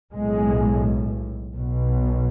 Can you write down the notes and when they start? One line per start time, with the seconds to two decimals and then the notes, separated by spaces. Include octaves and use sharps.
0.13 B1 A2 G#3
1.54 B1 B2